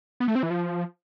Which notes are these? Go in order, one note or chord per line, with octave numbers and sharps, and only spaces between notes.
B3
A3
C4
E3
F3